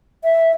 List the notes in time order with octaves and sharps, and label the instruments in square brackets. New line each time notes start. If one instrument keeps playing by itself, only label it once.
[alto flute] E5